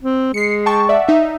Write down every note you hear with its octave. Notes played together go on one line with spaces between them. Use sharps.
C4
G#3 C7 C#7
G5 A5 C#6
D5 E5 F#5
D#4 E5